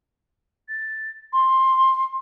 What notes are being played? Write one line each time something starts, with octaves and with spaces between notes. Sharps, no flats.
A6
C6